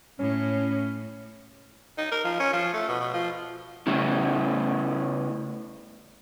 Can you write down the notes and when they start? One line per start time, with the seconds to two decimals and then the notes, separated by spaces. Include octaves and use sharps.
0.19 A2 C#4
1.98 D#4
2.12 A#4
2.24 F3
2.40 C#4
2.53 F3
2.73 A3
2.89 B2
3.00 B2
3.14 F3
3.87 C#3 A3 C#4 E4